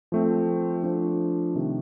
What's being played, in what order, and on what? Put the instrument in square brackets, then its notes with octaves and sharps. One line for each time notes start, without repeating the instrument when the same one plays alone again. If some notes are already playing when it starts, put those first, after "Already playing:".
[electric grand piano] F3 A3 C4
F3 A3 D4
C3 D#3